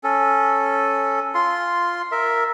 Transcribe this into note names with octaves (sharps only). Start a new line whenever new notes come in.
C#4 A4
F4 C6
A#4 E5